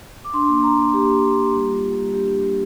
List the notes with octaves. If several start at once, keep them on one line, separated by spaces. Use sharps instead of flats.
D6
D4 C6
A#3
A#3 A#5
A#3
A#3 G4
A#3
D4
A#3
G3
F4
F4
G3
D4 G4
D4
G3